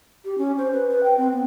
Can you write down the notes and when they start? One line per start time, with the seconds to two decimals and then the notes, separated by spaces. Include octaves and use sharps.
0.24 G4
0.38 C#4
0.57 C5
0.72 B4
0.89 B4
1.03 G5
1.17 C4
1.32 B3